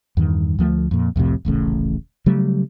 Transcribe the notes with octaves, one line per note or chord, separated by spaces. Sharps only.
E2 G2 D#3
D2 F3 G#3 A3
F2 A#2
C2 F2 A2 C3
D#1 A1 A2 C#3
C#3 F#3 G3 A3